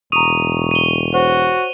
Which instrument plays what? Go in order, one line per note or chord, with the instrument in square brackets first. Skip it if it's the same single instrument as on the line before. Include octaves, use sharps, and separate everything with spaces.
[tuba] E1 [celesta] A#5 D#6 [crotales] C#6 D#7 F7
[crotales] D#7 G7
[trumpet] F#4 [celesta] C5 C#5 F#5